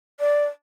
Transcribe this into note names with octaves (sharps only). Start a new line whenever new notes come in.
D5